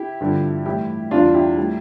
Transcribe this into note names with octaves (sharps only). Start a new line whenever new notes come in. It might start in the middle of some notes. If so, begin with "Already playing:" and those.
Already playing: E4 G4
G2 D3 F3
A2 E3 G3 E4 G4
E2 E3 G3 D4 F4
E4 G4
A2 G3